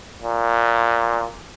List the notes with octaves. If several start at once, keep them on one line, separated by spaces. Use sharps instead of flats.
A#2